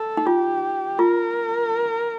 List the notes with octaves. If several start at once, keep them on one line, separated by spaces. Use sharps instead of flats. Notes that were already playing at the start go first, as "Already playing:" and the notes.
Already playing: A4
D#4
F4 G4
F4 A#4